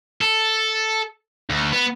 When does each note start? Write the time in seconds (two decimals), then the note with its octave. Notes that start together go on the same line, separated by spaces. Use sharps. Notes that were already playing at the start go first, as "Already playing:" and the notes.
0.21 A4
1.50 D2
1.72 B3